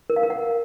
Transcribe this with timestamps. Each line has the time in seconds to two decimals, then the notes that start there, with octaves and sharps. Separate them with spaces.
0.10 A#4
0.16 F5
0.23 A#4
0.30 F#5